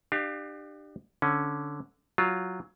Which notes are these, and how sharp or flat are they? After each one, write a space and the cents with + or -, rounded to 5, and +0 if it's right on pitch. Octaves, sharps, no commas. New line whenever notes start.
D4 +35 G4 +0 F5 +0
D3 -5 C#4 +0
F#3 +0 F4 +0